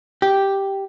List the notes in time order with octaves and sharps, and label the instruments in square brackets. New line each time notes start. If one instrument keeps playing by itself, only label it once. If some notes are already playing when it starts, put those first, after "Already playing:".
[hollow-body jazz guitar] G4